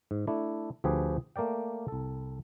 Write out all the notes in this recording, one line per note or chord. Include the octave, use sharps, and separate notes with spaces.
G#2
A3 D4 E4 A4
D2 F3 G4 G#4 B4 G5
A3 A#3 A#4 D5 G5
C2 A4